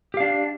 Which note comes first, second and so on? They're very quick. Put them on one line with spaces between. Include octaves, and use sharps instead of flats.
G4 F5 D4